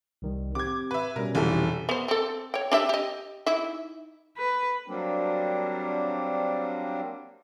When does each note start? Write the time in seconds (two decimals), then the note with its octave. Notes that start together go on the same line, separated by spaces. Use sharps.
0.22 C2 D#3 G3
0.55 C4 G4 D6 G#6
0.91 B4 E5
1.16 B2 G3 C#4 A#4
1.35 F1 E3 G4 A4
1.89 B3 C5
2.08 C4 A4
2.54 C#5 G5
2.72 D4 G4 E5
2.89 G4 D#5
3.46 D#4 E4 E5
4.37 B4
4.87 F#3 G3 A#3 C4 D4